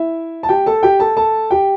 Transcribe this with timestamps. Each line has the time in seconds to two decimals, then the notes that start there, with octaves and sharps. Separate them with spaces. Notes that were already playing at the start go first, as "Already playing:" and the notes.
Already playing: E4 E5
0.43 A5
0.49 G4 G5
0.66 A4 A5
0.83 G4 G5
1.00 A4 A5
1.17 A4 A5
1.51 G4 G5